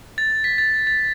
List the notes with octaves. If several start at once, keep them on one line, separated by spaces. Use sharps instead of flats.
A6
B6
A6
A6